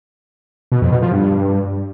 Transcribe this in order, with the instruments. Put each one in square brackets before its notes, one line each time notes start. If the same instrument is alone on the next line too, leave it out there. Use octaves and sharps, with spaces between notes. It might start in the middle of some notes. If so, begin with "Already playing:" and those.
[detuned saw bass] B2
F2
B2
F3
G2